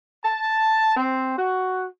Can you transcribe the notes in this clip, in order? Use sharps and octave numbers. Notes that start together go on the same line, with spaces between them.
A5
C4
F#4